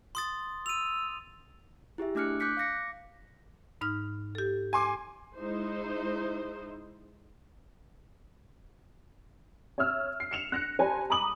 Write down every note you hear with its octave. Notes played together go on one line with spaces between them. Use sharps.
C6 D#6 A6
E6 D#7 F7
E4 G4 G#4 E5
A3 D4 D6 F6 F#6 C#7
D6 F#6 G6 B6 C#7
F5 D6 A#6 C#7
G#2 D#4 F6
G4 A4
G#5 C6 D6
G#3 D#4 E4 C5
C#5 E5 E6 F6
C7
C#7 E7 F7
F#6 A#6 C#7
G4 C5 D5 G#5 A5 B5
A#5 B5 D6 D#6 F#7